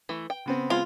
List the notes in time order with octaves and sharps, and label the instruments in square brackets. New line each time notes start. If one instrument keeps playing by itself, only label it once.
[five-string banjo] E3 A3
G5
[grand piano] C#3 B3 C4
[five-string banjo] G#3 [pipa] F4